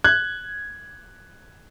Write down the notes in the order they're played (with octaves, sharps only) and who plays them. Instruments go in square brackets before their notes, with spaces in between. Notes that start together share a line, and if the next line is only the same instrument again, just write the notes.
[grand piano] F#6 G#6